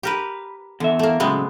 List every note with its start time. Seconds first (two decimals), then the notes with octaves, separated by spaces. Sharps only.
0.03 G4 A#4 B4
0.80 E2 D3 E5
0.99 A3 A#3
1.20 A2 C#3 F#3 G#3 B3 C4